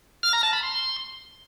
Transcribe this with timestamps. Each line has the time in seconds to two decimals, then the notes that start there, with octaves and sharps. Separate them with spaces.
0.23 F6
0.33 A#5
0.43 A5
0.53 B5
0.63 C6